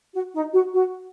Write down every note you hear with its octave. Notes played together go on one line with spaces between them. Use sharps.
F#4
D#4
F#4
F#4